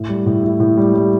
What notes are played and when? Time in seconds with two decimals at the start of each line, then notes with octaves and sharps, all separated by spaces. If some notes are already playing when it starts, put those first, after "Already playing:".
Already playing: A2
0.09 G3
0.26 A2
0.43 E4
0.60 A2
0.77 G3
0.94 G3